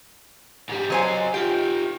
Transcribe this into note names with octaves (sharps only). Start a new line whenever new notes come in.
G#2 G3
F#3 C5 C#5 D#5 G#5
F4 G4 G5